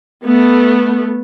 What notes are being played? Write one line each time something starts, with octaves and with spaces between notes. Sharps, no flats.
A3 B3